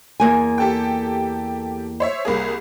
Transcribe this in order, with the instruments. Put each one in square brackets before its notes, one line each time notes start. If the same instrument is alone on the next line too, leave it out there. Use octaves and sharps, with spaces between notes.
[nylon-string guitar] E2 A#3 G#5
[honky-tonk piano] G4 A4 G5
C5 C#5 E5
C2 A#3 G#4